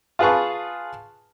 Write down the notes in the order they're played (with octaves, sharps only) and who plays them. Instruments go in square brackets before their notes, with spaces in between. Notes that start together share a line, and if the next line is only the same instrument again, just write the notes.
[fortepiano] F4 G#4 B4 A5 C#6